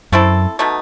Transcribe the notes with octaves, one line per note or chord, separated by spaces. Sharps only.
F#2 A3 C4 E4 A4
B2 A3 D#4